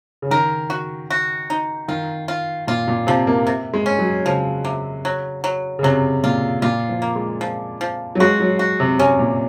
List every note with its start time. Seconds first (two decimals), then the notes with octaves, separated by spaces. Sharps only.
0.22 C#3
0.31 D#3 A#4
0.70 F#4
1.10 F#4
1.50 D#4
1.88 D#3 F4
2.28 F4
2.67 A#2 F4
2.88 A#2
3.07 C3 F3
3.27 A#3
3.47 C3
3.73 G#3
3.86 C#4
3.99 F#3
4.25 C#3 F3
4.65 C3
5.05 F#3
5.44 F#3
5.79 C#3
5.83 C3 F#3
6.24 A#2 F4
6.62 A#2 F4
6.89 F3
7.02 A#3
7.16 G#3
7.41 F3
7.81 F3
8.15 F#3
8.20 G#3 F#4
8.40 F#3
8.59 F#4
8.80 C3
8.99 C3 C#4
9.19 A#2